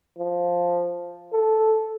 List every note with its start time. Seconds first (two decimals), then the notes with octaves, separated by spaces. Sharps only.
0.18 F3
1.33 A4